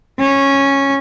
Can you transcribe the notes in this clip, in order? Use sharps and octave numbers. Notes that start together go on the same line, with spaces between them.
C#4